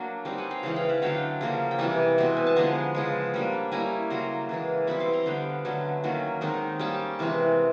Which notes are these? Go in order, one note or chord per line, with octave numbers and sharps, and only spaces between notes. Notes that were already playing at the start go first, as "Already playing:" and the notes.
Already playing: F#3 A#3 D4
G3 C4 D#4 F5 G5
F#5 G#5
F5 G5
C#3 E3 G#3 D#5 F5
F5 G5
E5 F#5
D3 F#3 A3 D4 F5 G5
C#3 F3 A#3
G5
C3 E3 G3 F#5 G#5
B2 G#3 C4
G#5
A5
D3 F3 G#3 B3 G#5 A#5
C#3 F3 G#3
G3 A#3 D4
G3 A#3 C#4 E4 G#5 A#5
C#3 F#3 A#3 A#5 C6
C#3 E3 G#3
B2 G3 C4 E4 B5 C#6
C6 D6
A#5 C6
D3 G3 B3 F5 G5
D3 F#3 A3 C#4
D#3 F#3 A#3 C#4
D#3 G#3 C4 D#4
G3 A#3 C#4 G5 A5
C3 E3 G#3 C4